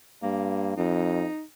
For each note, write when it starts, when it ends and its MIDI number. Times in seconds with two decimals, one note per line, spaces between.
0.23 0.74 43
0.23 0.76 58
0.77 1.26 41
0.77 1.43 63